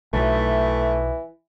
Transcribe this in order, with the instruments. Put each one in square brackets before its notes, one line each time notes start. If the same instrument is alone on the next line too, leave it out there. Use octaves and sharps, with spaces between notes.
[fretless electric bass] B1 F#3 [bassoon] E3 [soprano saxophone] A3